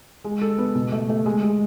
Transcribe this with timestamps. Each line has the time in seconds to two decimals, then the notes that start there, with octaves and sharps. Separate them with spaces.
0.25 G#3
0.42 A4
0.58 B3
0.75 B2
0.92 A3
1.10 A3
1.26 G#3
1.43 G#3